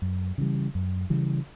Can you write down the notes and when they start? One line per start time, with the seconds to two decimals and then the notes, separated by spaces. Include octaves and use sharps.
0.02 F#2
0.38 C#3 E3 G3
0.75 F#2
1.10 C#3 E3 G3